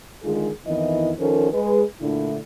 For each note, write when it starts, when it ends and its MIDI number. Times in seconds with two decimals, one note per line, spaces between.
0.24 0.50 50
0.24 0.50 51
0.24 0.50 56
0.24 0.50 65
0.24 0.50 68
0.66 1.12 41
0.66 1.12 51
0.66 1.12 52
0.66 1.12 59
0.66 1.12 64
0.66 1.12 75
1.20 1.50 51
1.20 1.50 53
1.20 1.50 61
1.20 1.50 69
1.20 1.50 70
1.20 1.50 72
1.53 1.83 56
1.53 1.83 68
1.53 1.83 71
2.01 2.38 46
2.01 2.38 50
2.01 2.38 57
2.01 2.38 62
2.01 2.38 64